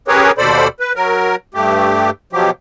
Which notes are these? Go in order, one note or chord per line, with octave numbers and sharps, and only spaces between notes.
C#4 G4 G#4 A#4 B4 C#5
D#2 B2 A4 C5 D5 B5
B4
F#3 A#4
G2 A3 G4
B2 F3 F#3 G4